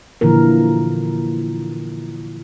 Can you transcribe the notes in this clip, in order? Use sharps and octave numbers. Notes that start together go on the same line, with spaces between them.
A#2 D3 E3 F3 A#3 A#4